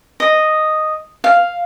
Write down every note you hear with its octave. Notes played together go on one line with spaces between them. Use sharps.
D#5
F5